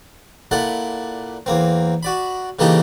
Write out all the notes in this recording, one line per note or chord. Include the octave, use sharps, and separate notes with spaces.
A#2 E4 A4 D5 F#5
E2 A#3 C4
F#4 D5 B5
C#3 E3 A#3 D#4 G4 A4